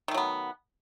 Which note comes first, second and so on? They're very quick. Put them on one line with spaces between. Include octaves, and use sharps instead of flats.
D#3 A3 F#3 B3